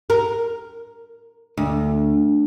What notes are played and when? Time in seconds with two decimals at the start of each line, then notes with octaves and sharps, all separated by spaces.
0.10 A#4
1.57 D2